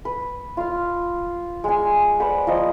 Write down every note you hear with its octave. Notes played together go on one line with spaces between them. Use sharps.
B4
F4 F5
G#3 G#5
B4 C5 D5 F#5
F3 A#3 D#5 D6